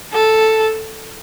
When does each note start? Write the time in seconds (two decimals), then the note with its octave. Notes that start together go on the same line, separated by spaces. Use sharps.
0.14 A4